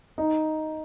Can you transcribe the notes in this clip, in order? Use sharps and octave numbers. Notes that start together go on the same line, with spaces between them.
D#4